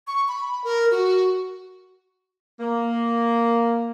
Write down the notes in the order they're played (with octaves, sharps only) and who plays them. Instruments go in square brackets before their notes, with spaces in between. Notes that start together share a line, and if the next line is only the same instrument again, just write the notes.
[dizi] C#6
B5
A#4
F#4
[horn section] A#3